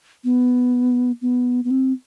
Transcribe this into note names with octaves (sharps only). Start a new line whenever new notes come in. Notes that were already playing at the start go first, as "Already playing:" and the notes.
B3
B3
B3
C4